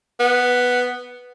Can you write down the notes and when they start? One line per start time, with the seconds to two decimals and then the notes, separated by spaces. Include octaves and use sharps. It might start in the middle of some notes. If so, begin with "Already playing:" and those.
0.20 B3